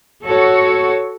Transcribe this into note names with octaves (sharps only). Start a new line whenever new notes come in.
F#4 A4 C#5